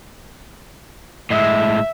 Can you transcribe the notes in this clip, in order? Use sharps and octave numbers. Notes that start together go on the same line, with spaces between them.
A2 G#3 E5